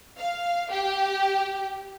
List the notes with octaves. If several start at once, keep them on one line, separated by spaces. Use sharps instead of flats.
F5
G4